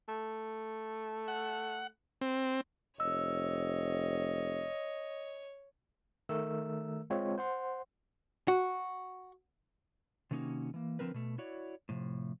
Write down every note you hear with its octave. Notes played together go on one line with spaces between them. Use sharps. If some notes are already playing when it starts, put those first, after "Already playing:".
A3
F#5
C4
F1 C#5 D#5 E6
D#3 A3 A#4 E6
G#3 C4 F4 C#5
C5 F#5 C6
F#4
C3 D#3 A#3 C#4 D#4 F#4
E3 A#3
D3 F3 C4 A#4 B4
B2 A3
E4 F#4 C#5 D5
A2 C3 F3